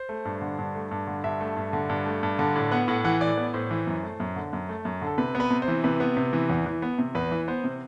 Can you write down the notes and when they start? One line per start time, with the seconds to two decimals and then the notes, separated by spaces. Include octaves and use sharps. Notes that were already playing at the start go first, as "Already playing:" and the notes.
Already playing: C5
0.09 A3
0.25 G2
0.42 D3
0.59 G2
0.75 A3
0.91 G2
1.08 D3
1.24 G2 E5
1.41 A3
1.57 G2
1.73 D3
1.90 G2
2.06 A3
2.23 G2
2.39 D3
2.55 A2
2.71 B3 F#5
2.88 A2 F#5
3.04 E3 F#5
3.21 A2 D5
3.37 B3
3.54 A2 C5
3.71 E3
3.87 F#2
4.03 A3
4.20 F#2
4.36 D3
4.53 F#2
4.69 A3
4.85 F#2
5.02 D3 A4
5.18 C3 B4
5.35 B3
5.40 B4
5.50 C3
5.62 C5
5.68 E3
5.84 C3 B4
6.00 B3
6.17 C3
6.33 E3
6.50 E2
6.66 E3
6.82 B3
6.99 C3
7.15 E2 B4
7.31 E3
7.48 B3 C5
7.64 C3